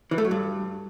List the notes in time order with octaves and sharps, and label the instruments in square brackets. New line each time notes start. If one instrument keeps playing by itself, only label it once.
[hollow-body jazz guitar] E3
A3
F#3
G2